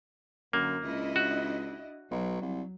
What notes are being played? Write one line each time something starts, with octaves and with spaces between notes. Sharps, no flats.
F#2 D3 A#3
C#2 D4 E4 D#5
F#4
B1 F#3
C2